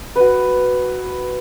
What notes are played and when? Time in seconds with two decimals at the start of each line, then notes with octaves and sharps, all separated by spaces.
0.16 F#4 B4